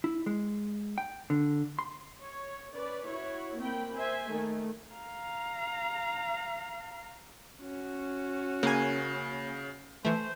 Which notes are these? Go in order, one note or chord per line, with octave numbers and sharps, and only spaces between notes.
E4
G#3
G5
D3
C6
C#5
C#4 B4 D5
E4 F#4 C#5
A#3 C4 G5 B5
C5 E5 G#5
D#3 A3
F5 A#5
C#4 F#4
C#3 A#3 G#5
E3 A3 C5